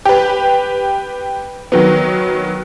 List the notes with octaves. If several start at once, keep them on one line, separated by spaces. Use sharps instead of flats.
G4 B4
D#3 F#3 B3